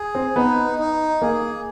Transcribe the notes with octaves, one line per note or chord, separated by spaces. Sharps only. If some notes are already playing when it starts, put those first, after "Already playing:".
Already playing: G#4
C4
B3 D#4
D#4
A#3 G#4